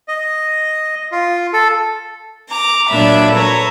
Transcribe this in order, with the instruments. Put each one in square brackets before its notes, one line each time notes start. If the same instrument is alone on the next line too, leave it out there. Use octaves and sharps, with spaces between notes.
[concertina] D#5
F4
A4
[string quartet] A#5 D6
A#2 F#3 D4 E5 B5
A4 B4 C#5 A#5